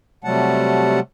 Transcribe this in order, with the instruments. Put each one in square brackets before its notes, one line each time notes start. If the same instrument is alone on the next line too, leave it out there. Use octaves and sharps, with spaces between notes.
[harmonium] C3 F#3 G3 A3 F#5 A5